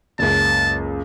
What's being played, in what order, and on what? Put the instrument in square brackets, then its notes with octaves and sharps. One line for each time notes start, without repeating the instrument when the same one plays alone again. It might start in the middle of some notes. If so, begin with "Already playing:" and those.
[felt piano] F#1 C#2 [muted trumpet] A5